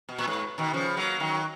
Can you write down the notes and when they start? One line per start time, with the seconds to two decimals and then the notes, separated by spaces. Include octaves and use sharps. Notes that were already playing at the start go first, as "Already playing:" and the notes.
0.09 B2
0.18 A#2
0.27 G#2
0.58 B2 D#3
0.73 C#3 F3
0.97 F#3 A#3
1.20 D#3 F#3